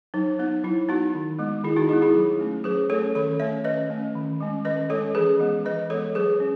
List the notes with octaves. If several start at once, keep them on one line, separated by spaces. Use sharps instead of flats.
F#3 D#4
B3 D#4
F#3 E4
B3 D#4 F#4
D#3
G#3 B3
D#3 E4 G#4
D#4 F#4
G#3 B3 E4 G#4
E4 G#4
F#3
A3 C#4
F#3 G#4 B4
A3 C#4 A4 C#5
D#3 A4 C#5
A3 C#4 C#5 E5
D#3 B4 D#5
A3 C#4
D#3
G#3 C#4
D#3 B4 D#5
G#3 C#4 A4 C#5
E3 G#4 B4
G#3 B3
E3 B4 D#5
G#3 B3 A4 C#5
F#3 G#4 B4
C#4